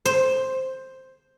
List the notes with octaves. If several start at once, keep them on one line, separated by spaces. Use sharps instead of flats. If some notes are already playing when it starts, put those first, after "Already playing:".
C5